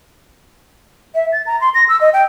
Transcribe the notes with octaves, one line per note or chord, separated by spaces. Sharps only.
E5
A6
A#5
C6
A#6
E6
D#5
G5